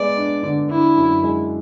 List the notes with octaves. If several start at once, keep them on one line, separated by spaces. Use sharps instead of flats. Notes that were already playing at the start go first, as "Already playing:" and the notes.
Already playing: G#3 B3 D5
D4
D3
D4 E4
F#2
G#3